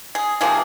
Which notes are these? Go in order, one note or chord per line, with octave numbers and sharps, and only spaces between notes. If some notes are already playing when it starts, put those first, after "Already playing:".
G#4
C3 F3 A#3 G#4